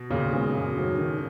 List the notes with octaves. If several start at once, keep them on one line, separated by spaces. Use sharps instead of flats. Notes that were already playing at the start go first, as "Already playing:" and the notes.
Already playing: B2
D#2 A#2 C#3
D#3 G#3 B3
F#2
D#3 F#3 C#4
D#3